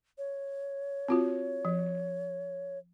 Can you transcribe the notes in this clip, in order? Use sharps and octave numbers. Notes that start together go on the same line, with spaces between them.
C#5
C4 F4 F#4
F3